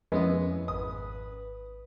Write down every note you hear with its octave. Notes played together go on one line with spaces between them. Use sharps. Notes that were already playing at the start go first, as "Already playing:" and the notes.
F2 G#3 B3 C#4 E4
G#1 B4 D#6